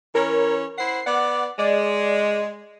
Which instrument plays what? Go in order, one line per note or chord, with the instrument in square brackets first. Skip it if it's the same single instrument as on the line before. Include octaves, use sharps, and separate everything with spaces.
[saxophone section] E3 C#4 C#5 [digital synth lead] A#4
[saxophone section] E4 C5 F#5 [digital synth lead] C7
[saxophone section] B3 D5 [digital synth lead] F#5
[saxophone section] G#3 [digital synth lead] D5